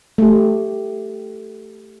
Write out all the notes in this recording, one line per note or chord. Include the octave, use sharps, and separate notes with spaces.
A3 G4